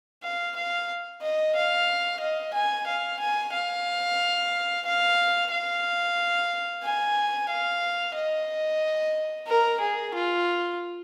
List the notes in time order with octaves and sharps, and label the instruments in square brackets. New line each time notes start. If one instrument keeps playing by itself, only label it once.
[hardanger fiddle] F5
F5
D#5
F5
D#5
G#5
F5
G#5
F5
F5
F5
G#5
F5
D#5
A#4
G#4
F4